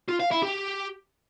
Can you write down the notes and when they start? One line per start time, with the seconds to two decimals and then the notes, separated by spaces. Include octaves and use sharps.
0.09 F4
0.20 F5
0.31 E4
0.43 G4